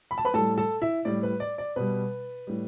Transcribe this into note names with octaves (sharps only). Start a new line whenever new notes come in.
B5
A5
B4 B5
A2 G3 A4 A5
A4 A5
E4 E5
A2 G3 D5
B4
D5
D5
B2 G3 B4
A2 G3